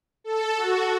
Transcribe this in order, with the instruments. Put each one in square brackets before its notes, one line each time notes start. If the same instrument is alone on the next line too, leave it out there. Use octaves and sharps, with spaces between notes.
[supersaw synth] A4
F#4